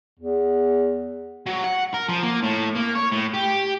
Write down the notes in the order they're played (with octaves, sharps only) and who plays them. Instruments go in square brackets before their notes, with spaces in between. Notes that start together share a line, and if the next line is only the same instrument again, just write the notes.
[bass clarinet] E2
[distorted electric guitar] F#3
F#5
A#4
F3
A#3
A2
A#3
C#5
A2
G4